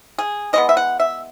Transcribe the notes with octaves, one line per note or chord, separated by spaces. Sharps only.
G#4
E3 G#3 B3 D#5
E5
F#5
E5